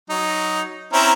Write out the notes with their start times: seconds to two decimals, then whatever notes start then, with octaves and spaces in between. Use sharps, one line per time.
0.10 F#3 D#4
0.93 C4 C#4 E4 A#5